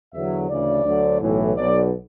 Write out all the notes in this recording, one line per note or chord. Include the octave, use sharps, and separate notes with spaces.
E2 D3 F#3 E5
D2 C#3 E3 D5
D2 D3 F#3
B1 A2 E3
B1 B2 F#3 D5